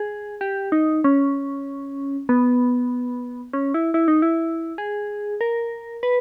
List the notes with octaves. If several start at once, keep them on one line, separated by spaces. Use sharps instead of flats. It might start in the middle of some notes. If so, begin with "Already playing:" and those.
Already playing: G#4
G4
D#4
C#4
B3
C#4
E4
E4
D#4
E4
G#4
A#4
B4